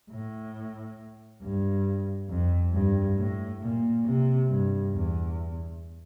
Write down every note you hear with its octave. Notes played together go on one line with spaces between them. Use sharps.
A2
G2
F2
G2
A2
A#2
C3
G2
E2